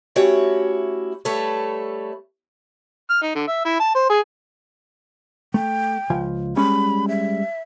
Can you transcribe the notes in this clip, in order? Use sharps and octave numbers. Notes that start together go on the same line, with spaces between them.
A3 C#4 E4 F#4 G4 C#5
G3 A3 A4 B4 C#5
F6
D#4
D3
E5
E4
A5
C5
G#4
A3 G5
C#2 F3 G#5
G3 G#3 C#4 B5
E5